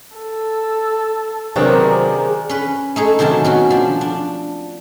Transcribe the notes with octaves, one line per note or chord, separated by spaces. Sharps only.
A4
C3 D#3 F#3 B3 C4 D4 G#4 A#4
C#4 B4
A3 D#4 G#4
C3 D#3 F#3 C#4 A5
B2 C#4 F#4
F3 D4
D4